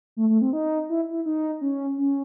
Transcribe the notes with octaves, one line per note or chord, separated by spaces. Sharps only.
A3
A3
C4
D#4
E4
E4
D#4
C#4
C#4